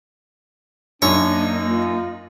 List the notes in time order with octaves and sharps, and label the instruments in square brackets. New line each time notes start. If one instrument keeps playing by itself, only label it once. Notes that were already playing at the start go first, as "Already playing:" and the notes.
[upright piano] F#2 [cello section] A#3 D#4 [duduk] D4 [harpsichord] C#5
[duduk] F4